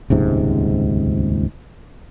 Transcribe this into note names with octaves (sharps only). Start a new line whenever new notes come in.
D#1 C#2 G#2 C3